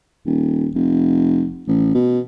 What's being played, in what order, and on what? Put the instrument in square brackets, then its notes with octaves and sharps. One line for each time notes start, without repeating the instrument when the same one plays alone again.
[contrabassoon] D#1
F1
A1
B2